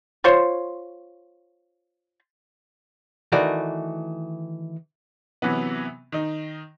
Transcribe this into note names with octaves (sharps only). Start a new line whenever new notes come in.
F4 C5 C#5
D#3 E3 A3 F#4 A#4 D5
C3 E3 F#3 B3
D#3 D#4